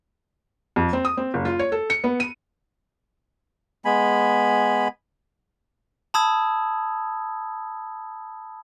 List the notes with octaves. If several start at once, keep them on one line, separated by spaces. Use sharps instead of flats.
F2
C4
D#6
C4
F#1
F4
C#5
A4
C#7
B3
D#7
G#3 B3 G#5 B5
A5 B5 D#6 E6 G#6